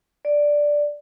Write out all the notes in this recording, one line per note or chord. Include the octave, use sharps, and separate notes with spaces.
D5